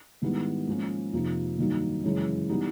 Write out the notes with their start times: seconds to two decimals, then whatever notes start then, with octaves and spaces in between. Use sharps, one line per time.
0.22 G#2 D#3 G3 B3 E4
0.68 G#2 F3 A#3 C#4
1.13 F2 C3 F3 A#3 D#4
1.58 G2 D#3 F#3 A#3 D#4
2.04 F#2 C#3 E3 G#3
2.49 E3 G3 B3 D#4